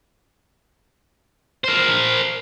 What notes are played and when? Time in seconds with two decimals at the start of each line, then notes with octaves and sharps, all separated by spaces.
1.64 A#4 C5